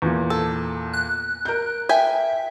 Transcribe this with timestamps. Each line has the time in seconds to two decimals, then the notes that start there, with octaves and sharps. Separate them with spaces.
0.02 E2 A#2
0.30 A4
0.93 F#6
1.45 A#4 G6
1.89 E5 G5 G#5